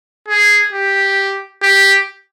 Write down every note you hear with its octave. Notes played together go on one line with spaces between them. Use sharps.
G#4
G4
G4